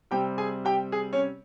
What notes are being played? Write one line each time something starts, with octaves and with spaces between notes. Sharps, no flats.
C3 G3 C4 G4 G5
G#4 G#5
G4 G5
G#4
C#4 C#5